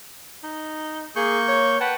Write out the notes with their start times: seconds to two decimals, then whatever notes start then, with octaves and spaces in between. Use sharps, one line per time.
0.43 D#4
1.16 A#3 G#4 C#6 G6
1.48 C#5
1.80 B4 F#5 G5 A5